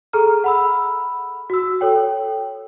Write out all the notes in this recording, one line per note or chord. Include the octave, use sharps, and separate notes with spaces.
G#4 A4 A#5 F6
F#5 B5 E6
F#4 E6
A4 C#5 G5